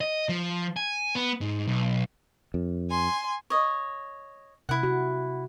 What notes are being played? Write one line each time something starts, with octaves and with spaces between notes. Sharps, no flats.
D#5
F3
G#5
B3
G#2
B1
F2
G#5 C6
C#5 D#5
C3 E4 F#5
F#4